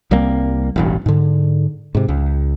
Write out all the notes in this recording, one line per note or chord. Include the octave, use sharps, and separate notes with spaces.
C2 G3 A#3 C4
E1 A1 G2
G#2 D3
G#2 C3
C#2